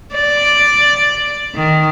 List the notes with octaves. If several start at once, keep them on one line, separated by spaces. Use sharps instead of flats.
D5
D#3